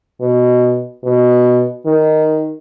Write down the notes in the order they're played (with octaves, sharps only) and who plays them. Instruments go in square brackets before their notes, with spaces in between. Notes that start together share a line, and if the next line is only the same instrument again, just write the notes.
[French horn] B2
B2
D#3